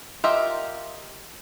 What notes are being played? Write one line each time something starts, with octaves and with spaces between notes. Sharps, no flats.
F4 G4 A#4 D#5 E5